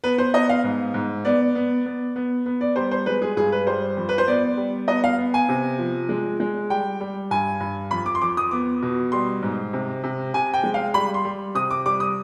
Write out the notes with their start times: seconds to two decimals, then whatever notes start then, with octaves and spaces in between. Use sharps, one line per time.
0.04 B3 B4
0.18 C5
0.34 B3 D#5
0.49 F5
0.64 G#2
0.94 G#2
1.25 B3 D5
1.55 B3
1.86 B3
2.16 B3
2.46 B3
2.61 D5
2.76 G3 C5
2.91 C5
3.06 G#3 B4
3.22 G#4
3.36 G2 G#4
3.52 B4
3.67 G3 C5
3.97 F2
4.09 B4
4.18 C5
4.27 B3 D5
4.57 G3
4.88 B3 D#5
5.04 F5
5.18 B3
5.34 G#5
5.49 C3
5.79 F3
6.09 G#3
6.40 G#3
6.70 G3 G5
7.00 G3
7.31 G2 G#5
7.60 G2
7.91 F2 B5
8.06 D6
8.15 C6
8.22 F2 D6
8.37 D#6
8.51 B3 D6
8.82 B2
9.12 G3 C6
9.42 G#2
9.73 C3
10.04 C3
10.34 C3 G#5
10.54 G5
10.63 G#3
10.74 F5
10.94 G3 B5
11.14 C6
11.25 G3
11.55 C3 D#6
11.71 D6
11.85 G3 D6
12.00 D#6